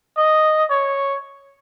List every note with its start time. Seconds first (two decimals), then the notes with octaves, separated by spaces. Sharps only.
0.17 D#5
0.70 C#5